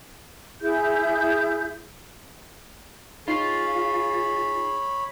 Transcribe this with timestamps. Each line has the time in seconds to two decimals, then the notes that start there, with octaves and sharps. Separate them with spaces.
0.61 E4 G#4 G6
3.28 D#4 F4 G#4 C#5 B5 C7